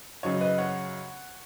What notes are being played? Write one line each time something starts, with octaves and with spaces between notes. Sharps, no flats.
F#2 C#3 F#3 D#4 C#5
B4 D#5
C#5 F#5